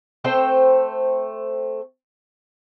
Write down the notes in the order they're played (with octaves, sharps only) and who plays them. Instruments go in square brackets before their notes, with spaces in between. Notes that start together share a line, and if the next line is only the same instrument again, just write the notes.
[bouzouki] A3 C4 C5 G5